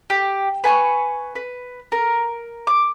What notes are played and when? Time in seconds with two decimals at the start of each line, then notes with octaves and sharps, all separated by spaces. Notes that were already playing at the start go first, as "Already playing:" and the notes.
0.10 G4
0.64 B4 G#5 A#5 C#6
1.35 B4
1.92 A#4
2.67 D6